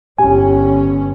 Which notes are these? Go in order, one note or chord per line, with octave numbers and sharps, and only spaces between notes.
G1 C#4 G4 G#5